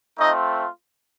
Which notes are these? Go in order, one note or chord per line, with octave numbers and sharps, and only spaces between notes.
A3 C4 D#4 F4 D#5